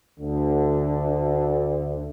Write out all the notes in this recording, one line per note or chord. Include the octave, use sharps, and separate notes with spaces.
D2 D3